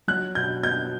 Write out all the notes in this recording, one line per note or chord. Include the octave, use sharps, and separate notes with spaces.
F#3 F#6
B2 G6
B3 G6